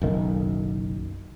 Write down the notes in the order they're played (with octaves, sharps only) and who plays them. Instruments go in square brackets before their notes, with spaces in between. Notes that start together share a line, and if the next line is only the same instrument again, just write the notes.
[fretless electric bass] F#1 B1 D#3